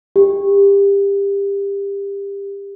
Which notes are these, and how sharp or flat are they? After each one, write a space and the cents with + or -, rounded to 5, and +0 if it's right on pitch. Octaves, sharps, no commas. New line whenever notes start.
G4 +25